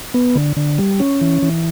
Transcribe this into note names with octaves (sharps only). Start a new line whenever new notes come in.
B3
D3
D3
G3
C#4
E3
E3